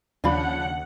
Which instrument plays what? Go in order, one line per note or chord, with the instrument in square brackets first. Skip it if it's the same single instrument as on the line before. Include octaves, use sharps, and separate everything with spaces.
[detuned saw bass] D#2 [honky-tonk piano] C#3 F3 D4 [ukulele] D5 F5 B5 [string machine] F#5